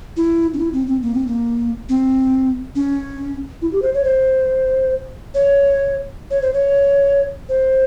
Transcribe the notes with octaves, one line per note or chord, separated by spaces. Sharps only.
E4
C#4
E4
C4
C4
A#3
C4
A#3
C4
C#4
E4
G4
C5
C#5
C5
C#5
C#5
C5
C#5
C5